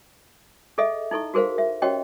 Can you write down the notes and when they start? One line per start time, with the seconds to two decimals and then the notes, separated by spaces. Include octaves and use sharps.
0.78 G#4 A4 D#5 E5
1.11 D#4 E4 A4 C#6
1.34 F#4 G#4 A#4 C5 F5
1.58 E5
1.82 C#4 F#4 G4 C#5 D#5 G5